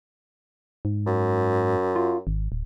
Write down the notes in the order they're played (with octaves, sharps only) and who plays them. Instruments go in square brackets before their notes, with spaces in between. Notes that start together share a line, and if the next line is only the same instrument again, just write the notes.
[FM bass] G#2
[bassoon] F#2
[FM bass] F4
G#1
D1